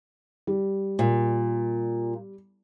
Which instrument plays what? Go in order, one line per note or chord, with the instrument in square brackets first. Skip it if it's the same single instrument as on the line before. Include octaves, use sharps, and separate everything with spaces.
[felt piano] G3
[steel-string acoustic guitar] A#2